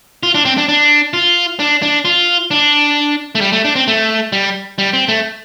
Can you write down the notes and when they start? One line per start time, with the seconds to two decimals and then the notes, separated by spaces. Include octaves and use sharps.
0.23 F4
0.35 D4
0.45 C4
0.58 D4
0.69 D4
1.13 F4
1.59 D4
1.82 D4
2.05 F4
2.51 D4
3.35 A3
3.41 G3
3.53 A3
3.65 D4
3.76 C4
3.88 A3
4.32 G3
4.78 G3
4.93 C4
5.08 A3